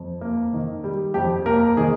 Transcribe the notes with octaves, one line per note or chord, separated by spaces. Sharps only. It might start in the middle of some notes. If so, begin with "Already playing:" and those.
Already playing: F2
A#3
D#3
G3
F2 G4
A#3 A#4
D#3 G#4